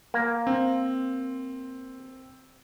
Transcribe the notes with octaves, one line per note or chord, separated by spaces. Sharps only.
A#3
C4